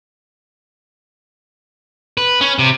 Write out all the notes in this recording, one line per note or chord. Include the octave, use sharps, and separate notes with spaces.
B4
C#4
C3